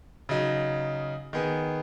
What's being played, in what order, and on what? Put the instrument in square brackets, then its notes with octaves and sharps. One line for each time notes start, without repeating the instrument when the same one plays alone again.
[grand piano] C#3 F#3 D#4
D#3 B3 G#4